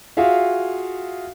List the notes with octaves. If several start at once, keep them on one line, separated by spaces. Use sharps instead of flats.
F4 F#4 G#4 E5 F5